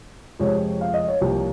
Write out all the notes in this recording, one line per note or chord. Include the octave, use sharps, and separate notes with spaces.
F2 C3 F3 G#3 C#5
F5
D#5
C#5
C2 C3 F3 A#3